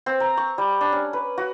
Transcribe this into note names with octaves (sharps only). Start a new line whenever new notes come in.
C4
A#5
C#6
G3
D4
C#4
B4
F#4